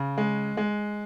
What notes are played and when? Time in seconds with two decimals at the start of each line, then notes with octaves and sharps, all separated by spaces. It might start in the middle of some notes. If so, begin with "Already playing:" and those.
Already playing: C#3
0.18 G#3
0.57 G#3